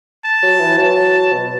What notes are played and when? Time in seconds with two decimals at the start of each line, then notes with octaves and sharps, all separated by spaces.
0.25 A5
0.43 F#3
0.60 E3
0.78 F#3 A5
1.32 B2